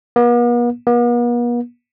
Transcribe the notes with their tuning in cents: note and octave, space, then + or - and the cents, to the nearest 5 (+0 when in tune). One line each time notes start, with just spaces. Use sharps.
B3 -45
B3 -45